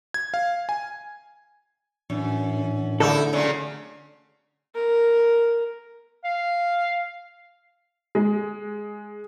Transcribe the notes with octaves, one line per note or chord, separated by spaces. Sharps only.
G#6
F5
G#5
F#2 A2 E3 D4
D3 A3 D#4 E4 A4
A#2 C#3 F#3
A#4
F5
G#3